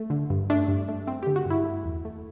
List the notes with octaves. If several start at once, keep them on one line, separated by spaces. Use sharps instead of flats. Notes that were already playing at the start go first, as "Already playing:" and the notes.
Already playing: A3
D3
G2
A3 D4
G2
A3
A3 C4
G4
D3
F#4
G2 E4
A3
E2
A3